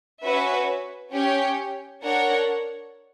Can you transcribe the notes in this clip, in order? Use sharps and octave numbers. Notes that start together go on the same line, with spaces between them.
C#4 F#4 B4 E5
C#4 G4 C#5 G5
D4 A#4 C#5 F#5